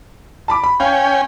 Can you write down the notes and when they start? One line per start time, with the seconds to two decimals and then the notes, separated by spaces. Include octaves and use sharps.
0.48 A5 B5 D6
0.64 B5
0.80 C#4 F5 G5 G#5